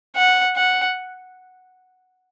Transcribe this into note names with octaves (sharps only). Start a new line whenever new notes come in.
F#5
F#5